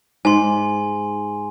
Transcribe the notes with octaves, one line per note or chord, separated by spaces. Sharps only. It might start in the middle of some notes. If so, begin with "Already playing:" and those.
G#2 G#5 C6